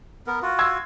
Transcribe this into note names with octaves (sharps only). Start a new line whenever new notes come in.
B3 A#4
F4 F#4
C6 E6 G#6